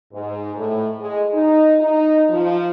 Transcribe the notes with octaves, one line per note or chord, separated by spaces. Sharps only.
G#2
A2
G#3
D#4
D#4
F3